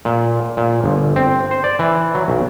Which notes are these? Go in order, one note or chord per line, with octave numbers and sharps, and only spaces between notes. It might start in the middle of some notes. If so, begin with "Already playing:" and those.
A#2
A#2
G1
C4
C5
D5
E3
F#3
B1